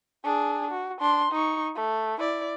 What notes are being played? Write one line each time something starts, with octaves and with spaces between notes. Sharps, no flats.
D4 G#4
F#4
D4 C6
D#4 C#6
A3
E4 D5